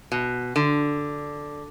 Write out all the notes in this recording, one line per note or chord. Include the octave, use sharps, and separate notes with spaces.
B2
D3